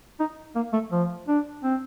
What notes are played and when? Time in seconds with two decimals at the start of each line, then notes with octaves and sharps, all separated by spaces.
0.20 D#4
0.55 A#3
0.73 A3
0.92 F3
1.28 D4
1.64 C4